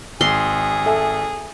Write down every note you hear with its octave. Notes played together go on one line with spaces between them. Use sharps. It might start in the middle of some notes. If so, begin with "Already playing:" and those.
G#1 G#4 C6
A4 E5 G#5